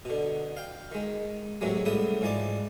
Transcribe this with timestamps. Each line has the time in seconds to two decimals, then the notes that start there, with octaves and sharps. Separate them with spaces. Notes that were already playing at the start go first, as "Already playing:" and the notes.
0.05 B2 D3
0.57 F5 G5
0.92 D#3 G#3
1.61 A1 D#2 C3 D#3 F#3 G#3
1.85 C2 A2 C#3 B3 E5 D#6
2.21 G#2 E3 F3 D5 A5